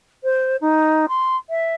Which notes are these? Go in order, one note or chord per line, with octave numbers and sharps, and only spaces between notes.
C5
D#4
C6
E5